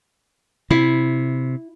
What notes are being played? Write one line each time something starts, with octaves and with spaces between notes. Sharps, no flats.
C3 E4